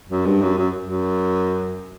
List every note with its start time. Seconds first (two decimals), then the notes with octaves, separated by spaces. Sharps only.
0.09 F#2
0.26 G2
0.42 F#2
0.58 F#2
0.81 F#2